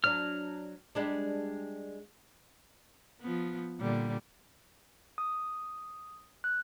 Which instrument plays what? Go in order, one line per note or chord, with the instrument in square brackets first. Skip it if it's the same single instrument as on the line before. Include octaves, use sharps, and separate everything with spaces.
[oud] F#3 D4 [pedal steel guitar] F6
[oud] G3 G#3 D4
[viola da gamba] F3 B3
A#2 D3 G3
[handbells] D#6
F#6